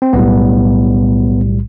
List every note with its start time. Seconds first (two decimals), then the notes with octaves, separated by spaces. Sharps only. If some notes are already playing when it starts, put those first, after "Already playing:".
0.02 C4
0.13 B1 A2 G3 B3